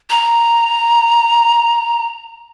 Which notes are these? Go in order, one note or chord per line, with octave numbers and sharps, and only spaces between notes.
A#5